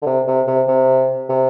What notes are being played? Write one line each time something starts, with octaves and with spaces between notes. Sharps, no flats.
D3
C3
C3
C3
C3
C3